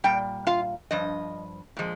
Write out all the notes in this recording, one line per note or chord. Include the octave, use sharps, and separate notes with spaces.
A#2 G3 G5
F4 F5
G2 F3 D#5
A#2 F3 G#3